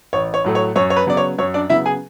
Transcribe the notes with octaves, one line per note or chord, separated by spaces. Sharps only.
A1 C#5
C#5
A2 F#3 A3
C#5
F#2 C#5
C#5
B4
C#3 F#3 B3 D5
C#5
F#2 C#5
D4 D5
C#3 F#3 B3 E4 E5
G#4 G#5